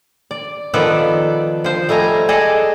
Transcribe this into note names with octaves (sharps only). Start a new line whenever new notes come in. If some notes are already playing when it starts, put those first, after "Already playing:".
D5
D#3 F3 B3 A4 B4 D5
F3 C5
G3 A3 D#5 G#5 A#5
G#4 A4 D5 D#5 G#5 A5